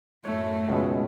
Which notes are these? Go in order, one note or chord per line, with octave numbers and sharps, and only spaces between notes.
F#2 A2 A3 C#5
C#2 B2 G#3